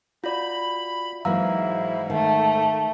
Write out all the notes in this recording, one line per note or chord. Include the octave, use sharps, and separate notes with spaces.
F4 F#4 D5 B5
G#2 E3 F#3 A#3 E4 F5 A#5 E6
D#3 A3